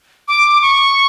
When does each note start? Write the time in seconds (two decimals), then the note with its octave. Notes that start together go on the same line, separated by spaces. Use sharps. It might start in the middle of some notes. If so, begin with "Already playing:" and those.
0.28 D6
0.62 C#6